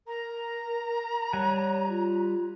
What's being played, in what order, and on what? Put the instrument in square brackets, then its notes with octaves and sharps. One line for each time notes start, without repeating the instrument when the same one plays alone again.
[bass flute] A#4 [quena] A#5
[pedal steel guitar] G3 F#5 G#5 [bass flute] C#5
[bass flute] F4